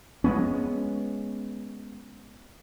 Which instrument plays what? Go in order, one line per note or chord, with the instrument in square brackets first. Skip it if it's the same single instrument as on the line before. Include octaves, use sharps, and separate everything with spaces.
[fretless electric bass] G#3 A#3 B3 C#4